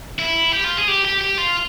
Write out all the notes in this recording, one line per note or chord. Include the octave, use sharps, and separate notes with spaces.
E4
G4
F4
G#4
G4
G4
G4
F4